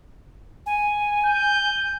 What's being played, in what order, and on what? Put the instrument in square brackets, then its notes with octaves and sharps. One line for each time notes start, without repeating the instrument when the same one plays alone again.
[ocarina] G#5
[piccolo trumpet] G6